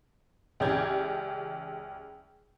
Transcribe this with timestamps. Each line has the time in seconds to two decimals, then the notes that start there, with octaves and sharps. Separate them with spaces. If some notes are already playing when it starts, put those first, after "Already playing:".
0.60 C#2 E3 G4 D5 G6 G#6